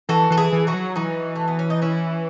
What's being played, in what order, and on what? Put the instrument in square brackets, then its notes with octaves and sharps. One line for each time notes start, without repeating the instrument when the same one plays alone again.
[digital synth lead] E3 [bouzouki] F#4 A4
[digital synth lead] E3 [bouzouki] A4
[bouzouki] E4 G#4
[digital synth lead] E3
[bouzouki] D#4 F#4
[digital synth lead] F#3
[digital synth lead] E3 [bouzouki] D#4 F#4
[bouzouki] A3
B3
C#4
D#4
C#4 E4